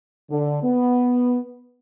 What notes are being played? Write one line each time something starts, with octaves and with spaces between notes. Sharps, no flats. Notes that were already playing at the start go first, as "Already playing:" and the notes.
D3
B3